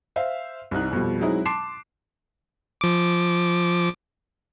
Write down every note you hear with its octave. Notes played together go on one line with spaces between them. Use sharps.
C5 E5 F5
C2 C3 D#4 F#6
F2 B2 F3 G3
F#3 G#3 C4 D#4 E4
A5 C6 D6 C7 E7
F3 D6